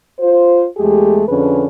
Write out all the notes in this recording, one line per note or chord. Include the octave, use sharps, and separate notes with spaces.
F4 C5
E2 G#3 A3 G4 G#4
F2 D3 C#4 G#4 B4